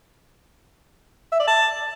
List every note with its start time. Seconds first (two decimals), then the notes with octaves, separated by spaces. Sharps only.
1.32 E5
1.40 D5
1.47 A5